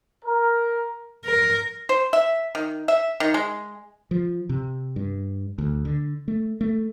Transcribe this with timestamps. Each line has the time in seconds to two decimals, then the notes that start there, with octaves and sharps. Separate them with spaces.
0.25 A#4
1.25 A#4
1.89 C5
2.13 E5
2.55 D#3
2.88 E5
3.20 D#3
3.34 G#3
4.11 F3
4.49 C3
4.96 G2
5.58 D2
5.85 D3
6.28 A3
6.61 A3